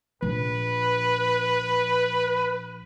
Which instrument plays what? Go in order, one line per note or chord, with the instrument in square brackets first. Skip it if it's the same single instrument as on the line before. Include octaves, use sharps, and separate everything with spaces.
[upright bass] A#1 [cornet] B4